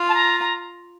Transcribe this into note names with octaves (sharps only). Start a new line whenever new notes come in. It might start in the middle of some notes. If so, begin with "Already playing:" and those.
Already playing: F4
A5
A#5
A#5